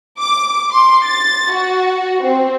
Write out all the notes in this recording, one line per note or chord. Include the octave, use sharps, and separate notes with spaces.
D6
C6
A6
F#4
C4